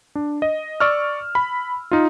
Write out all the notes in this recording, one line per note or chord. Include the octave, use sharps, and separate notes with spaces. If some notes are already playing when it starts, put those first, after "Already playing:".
D4
D#5
D5 C#6 E6 F6
B5
D#4 F4